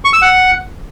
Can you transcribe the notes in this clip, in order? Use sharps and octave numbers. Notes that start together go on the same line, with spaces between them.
C#6
E6
F#5